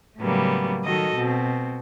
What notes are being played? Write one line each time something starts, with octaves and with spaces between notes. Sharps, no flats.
A2 C#3 F#3 G3 A#3 B3
D#3 F#3 F#4 A4 D#5
B2 C4